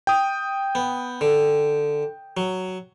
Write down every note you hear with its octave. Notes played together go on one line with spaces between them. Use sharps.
G5 D#6
B3
D3
F#3